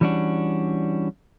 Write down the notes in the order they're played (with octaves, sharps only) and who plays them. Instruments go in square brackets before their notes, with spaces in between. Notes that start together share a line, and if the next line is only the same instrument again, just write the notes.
[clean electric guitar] E3 G3 C#4 D4 F#4